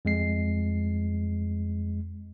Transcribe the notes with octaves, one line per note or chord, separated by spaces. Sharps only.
F2 G#3 C7